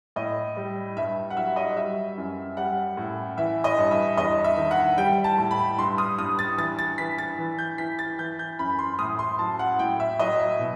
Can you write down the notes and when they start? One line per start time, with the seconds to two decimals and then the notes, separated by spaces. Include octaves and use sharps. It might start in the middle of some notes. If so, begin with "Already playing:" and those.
0.16 A2 D#5
0.57 G3
0.97 G2 E5
1.30 F#5
1.36 F#3 E5
1.56 D#5
1.77 G3 E5
2.18 F#2
2.57 G3 F#5
2.97 A2
3.37 E3 E5
3.64 D#5
3.78 G2
3.91 E5
4.17 E2 D#5
4.44 E5
4.57 D#3
4.71 F#5
4.98 G3 G5
5.24 A5
5.38 A2
5.51 B5
5.78 G2 C6
5.98 D#6
6.18 G2 D#6
6.39 A6
6.58 E3 A6
6.79 A6
6.98 E3 B6
7.18 A6
7.39 E3
7.59 G6
7.78 E3 B6
7.99 A6
8.19 E3 G6
8.39 G6
8.59 F#2 B5
8.79 C6
8.99 A2 D#6
9.19 C6
9.39 F#3 A5
9.59 F#5
9.79 A2 G5
10.00 E5
10.19 F#3 D#5
10.39 E5
10.60 B2